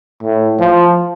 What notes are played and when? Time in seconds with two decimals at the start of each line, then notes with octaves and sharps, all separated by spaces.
0.23 A2
0.60 F3